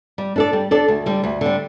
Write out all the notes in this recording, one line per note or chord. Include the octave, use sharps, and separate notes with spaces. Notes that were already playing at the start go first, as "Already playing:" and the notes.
G3
D4 A4 D5
G3
D4 A4 D5
D2
D3 G3
D2
D3 G3